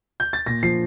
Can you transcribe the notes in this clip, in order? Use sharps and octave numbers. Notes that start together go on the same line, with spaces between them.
G6
A6
A#2 A#6
F3 C7